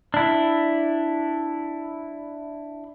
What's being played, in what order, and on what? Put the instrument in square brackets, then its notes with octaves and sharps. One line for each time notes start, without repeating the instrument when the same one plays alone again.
[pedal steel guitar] D4 E4